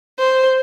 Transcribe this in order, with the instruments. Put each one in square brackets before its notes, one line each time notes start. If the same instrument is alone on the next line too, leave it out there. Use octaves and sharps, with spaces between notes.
[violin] C5